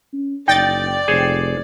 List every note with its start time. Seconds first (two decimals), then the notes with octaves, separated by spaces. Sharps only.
0.13 C#4
0.48 F#1 D#4 D5 G5 A6
1.08 F1 G#4 C5 C#5